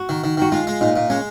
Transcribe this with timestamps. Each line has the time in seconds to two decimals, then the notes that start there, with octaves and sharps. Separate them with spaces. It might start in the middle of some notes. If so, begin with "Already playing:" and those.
Already playing: F#4
0.09 D#3
0.24 D#3
0.37 D#3 F#4
0.52 G#3 F4
0.67 G#3
0.81 A#2 D#4
0.96 A#2
1.10 G#3 C#4